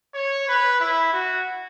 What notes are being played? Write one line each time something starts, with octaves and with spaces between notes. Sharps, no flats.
C#5
B4
E4
F#4